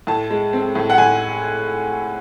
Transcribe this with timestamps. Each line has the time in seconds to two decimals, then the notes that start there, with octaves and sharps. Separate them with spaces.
0.07 A2 A5
0.30 G#3
0.53 C4
0.75 A2
0.90 F#5
0.98 A2 G#5